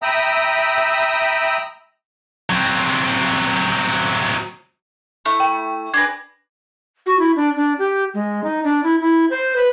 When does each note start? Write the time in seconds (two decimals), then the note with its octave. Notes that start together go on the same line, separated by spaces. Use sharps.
0.02 E5 G5 A#5 B5 D#6 E6
2.50 F#3 C4
5.25 A3 E4
5.40 G5
5.94 D4 G#4 B4 G#6 A#6
7.06 F#4
7.19 E4
7.36 D4
7.56 D4
7.79 G4
8.14 G#3
8.44 D#4
8.64 D4
8.84 E4
9.01 E4
9.30 C5
9.56 B4